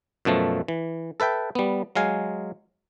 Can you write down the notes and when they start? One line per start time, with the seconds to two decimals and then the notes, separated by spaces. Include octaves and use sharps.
0.25 F#2 B2 F3 A3
0.68 E3
1.20 A4 B4 E5 G5
1.55 G3 B3
1.95 F#3 G#3 F5 G#5